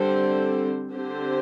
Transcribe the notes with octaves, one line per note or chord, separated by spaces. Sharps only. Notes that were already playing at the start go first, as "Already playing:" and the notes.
Already playing: D3 G3 C4 A4 C5
D3 C4 G4 C5